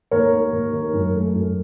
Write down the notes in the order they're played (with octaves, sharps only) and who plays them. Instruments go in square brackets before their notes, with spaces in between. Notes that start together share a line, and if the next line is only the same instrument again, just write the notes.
[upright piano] D#2 A#4 C#5
A#3
D#2
D#3
F#2
A3
F#2